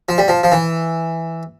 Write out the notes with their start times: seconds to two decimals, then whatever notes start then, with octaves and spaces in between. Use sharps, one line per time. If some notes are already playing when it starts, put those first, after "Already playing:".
0.09 F3
0.18 G3
0.28 F3
0.43 F3
0.52 E3